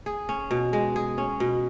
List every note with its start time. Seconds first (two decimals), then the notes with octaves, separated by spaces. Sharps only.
0.06 G#4
0.29 C#4
0.51 B2
0.73 G#3
0.96 G#4
1.18 C#4
1.40 B2